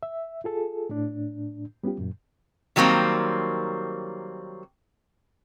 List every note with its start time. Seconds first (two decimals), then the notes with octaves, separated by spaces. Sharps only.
0.03 E5
0.44 F4 G#4 A4
0.89 A2 D4
1.83 G3 B3 C#4 F4 G4
1.99 F#2 A#2
2.76 D#3 F#3 G3 A#3 C4